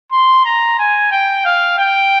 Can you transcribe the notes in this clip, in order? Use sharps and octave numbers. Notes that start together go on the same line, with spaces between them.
C6
A#5
G#5
G5
F5
G5